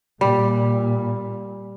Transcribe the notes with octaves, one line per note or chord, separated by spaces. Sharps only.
A#2 G3